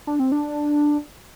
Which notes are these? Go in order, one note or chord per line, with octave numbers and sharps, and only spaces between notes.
D4
C4
D4